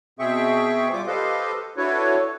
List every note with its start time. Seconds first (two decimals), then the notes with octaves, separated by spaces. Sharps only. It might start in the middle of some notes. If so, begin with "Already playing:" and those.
0.19 B2 C4 G#4 E5 G5 C#6
0.93 G3 F4 D6
1.07 G4 A4 B4 C5 D#5 F5
1.77 D4 E4 F#4 A4 B4 C#5